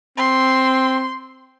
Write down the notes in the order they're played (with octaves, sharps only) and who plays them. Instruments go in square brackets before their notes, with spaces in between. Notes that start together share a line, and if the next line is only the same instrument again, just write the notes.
[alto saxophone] C4 [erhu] C6